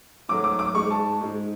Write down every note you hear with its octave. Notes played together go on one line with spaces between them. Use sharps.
G#2 F#3 A3 D6
D6
D6
G#2 G#3 C#6
A5
G#2 G#3